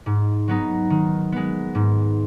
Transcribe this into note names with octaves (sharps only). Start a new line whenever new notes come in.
G#2
F#3 B3 D#4
D#3
G#3 B3
G#2